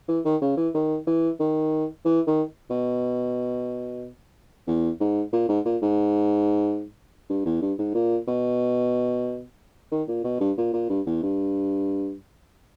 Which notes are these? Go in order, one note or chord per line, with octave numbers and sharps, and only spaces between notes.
E3
D#3
C#3
E3
D#3
E3
D#3
E3
D#3
B2
E2
G#2
A#2
G#2
A#2
G#2
G2
E2
G2
G#2
A#2
B2
D#3
A#2
B2
G2
A#2
A#2
G2
E2
G2